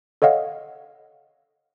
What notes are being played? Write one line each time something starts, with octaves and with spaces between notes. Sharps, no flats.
A4 C#5 D#5 F5 F#5